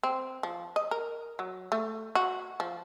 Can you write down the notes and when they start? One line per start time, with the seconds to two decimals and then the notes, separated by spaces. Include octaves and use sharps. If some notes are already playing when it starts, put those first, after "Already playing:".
0.03 C4
0.43 F3
0.76 D#5
0.91 A#4
1.39 F#3
1.72 A3
2.15 F#4
2.60 F3